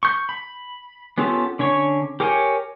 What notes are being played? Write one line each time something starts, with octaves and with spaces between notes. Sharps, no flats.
C#6 G6
B5
B3 C#4 F4 G4 A4
D3 C#4 C#5 C#6
G4 A#4 C#5 G5 G#5